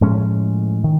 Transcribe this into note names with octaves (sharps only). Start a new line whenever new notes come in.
A2 F3 G#3 C#4
D#3